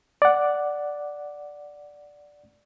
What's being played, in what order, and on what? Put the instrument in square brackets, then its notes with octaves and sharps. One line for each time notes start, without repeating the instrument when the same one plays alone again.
[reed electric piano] D5 F#5